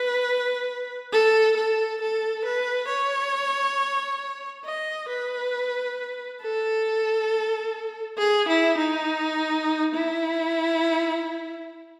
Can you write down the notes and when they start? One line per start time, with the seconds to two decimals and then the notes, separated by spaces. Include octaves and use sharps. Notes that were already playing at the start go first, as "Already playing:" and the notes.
Already playing: B4
1.13 A4
1.57 A4
2.01 A4
2.45 B4
2.89 C#5
4.65 D#5
5.10 B4
6.43 A4
8.19 G#4
8.48 E4
8.78 D#4
9.94 E4